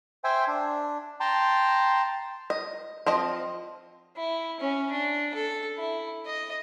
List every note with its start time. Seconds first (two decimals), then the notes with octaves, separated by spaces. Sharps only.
0.24 C5 E5 G5 G#5
0.48 D4
1.20 G5 A5 A#5 C6
2.50 D#5
3.06 F3 C4 D#5
4.17 E4
4.60 C#4
4.92 D4
5.34 A4
5.79 E4
6.26 D#5